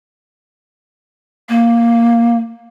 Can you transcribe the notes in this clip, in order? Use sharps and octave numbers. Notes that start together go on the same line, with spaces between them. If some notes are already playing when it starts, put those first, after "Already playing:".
A#3